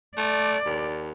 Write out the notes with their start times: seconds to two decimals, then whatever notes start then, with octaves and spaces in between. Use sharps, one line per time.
0.17 A3 D5
0.66 D#2